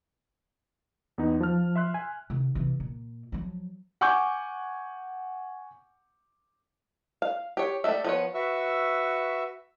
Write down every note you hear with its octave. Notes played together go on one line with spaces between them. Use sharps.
E2 B3 D#4
F3 A5 F6
E5 C6 F#6
G#5
C3 D#3
C3 E3
A#2
F3 F#3
F#5 G#5 C#6 D6 G6
F5
G4 C#5
G3 A3 D#4 A4 E5
F3 B3 C#5
F#4 B4 E5 C#6 E6